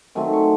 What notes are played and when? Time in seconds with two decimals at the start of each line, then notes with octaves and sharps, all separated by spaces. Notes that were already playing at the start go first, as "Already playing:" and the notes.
0.15 D#3 F#3 A3 C4 G#5
0.33 C#6